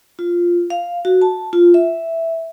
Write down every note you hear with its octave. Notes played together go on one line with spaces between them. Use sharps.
F4
F5
F#4
A5
F4
E5